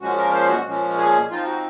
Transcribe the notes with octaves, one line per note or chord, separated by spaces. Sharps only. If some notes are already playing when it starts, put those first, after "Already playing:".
A#2 F3 G#3 C#4 F#4
A#4
C5
F#4
A#2 F3 G#3 C#4
G#4
F3 C4 D#4 F4
F#4